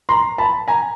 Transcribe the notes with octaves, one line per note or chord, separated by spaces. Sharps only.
A#5 C6
A5 B5
G#5 A#5